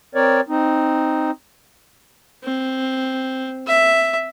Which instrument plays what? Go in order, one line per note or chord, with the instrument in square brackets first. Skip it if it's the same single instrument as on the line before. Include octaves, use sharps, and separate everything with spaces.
[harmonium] C4 A#4 C#5 D5
C4 D#4
[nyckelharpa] C4
E5